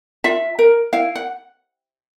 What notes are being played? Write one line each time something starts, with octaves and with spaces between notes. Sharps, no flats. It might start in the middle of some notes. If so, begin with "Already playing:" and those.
F4 E5
A#4
E4 F5
F#5